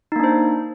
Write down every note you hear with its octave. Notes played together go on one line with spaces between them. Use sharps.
A#3 D4 D#4 C5